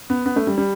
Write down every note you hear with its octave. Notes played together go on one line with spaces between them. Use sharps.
B3
B3
A3
G3
G3